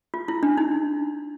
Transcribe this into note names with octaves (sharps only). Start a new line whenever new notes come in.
F4
E4
D4
D#4